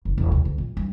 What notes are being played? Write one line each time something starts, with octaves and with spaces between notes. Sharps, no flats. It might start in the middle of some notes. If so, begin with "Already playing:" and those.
F#1
E1
D#2
D2
A#2
G2